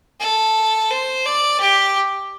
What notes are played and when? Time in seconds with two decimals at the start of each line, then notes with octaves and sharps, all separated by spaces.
0.20 A4
0.90 C5
1.26 D5
1.61 G4